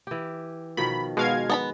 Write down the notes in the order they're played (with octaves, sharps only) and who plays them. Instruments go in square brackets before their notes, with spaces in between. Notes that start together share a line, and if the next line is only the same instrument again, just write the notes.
[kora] E3 G4
[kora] B2 D#3 F3 [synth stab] B5
[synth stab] B2 F5 G#6 [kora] G#3
[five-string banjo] B3 A5 B5